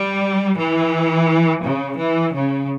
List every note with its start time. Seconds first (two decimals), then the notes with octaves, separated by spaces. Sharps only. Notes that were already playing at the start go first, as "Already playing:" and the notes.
Already playing: G3
0.59 E3
1.64 C#3
1.99 E3
2.35 C#3